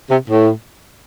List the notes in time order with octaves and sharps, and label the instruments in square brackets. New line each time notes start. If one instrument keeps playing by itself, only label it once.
[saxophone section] C3
A2